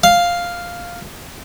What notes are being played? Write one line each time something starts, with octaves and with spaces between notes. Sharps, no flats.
F5